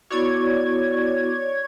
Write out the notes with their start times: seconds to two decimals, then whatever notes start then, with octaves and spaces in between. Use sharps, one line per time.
0.11 B3 E4 F#4 C#5 D5 G#6